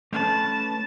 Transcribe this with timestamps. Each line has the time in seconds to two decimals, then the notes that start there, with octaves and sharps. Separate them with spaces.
0.13 A3 C#4 B4 A5